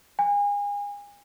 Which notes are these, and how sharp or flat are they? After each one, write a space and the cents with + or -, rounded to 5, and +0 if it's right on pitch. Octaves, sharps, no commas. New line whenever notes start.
G#5 -35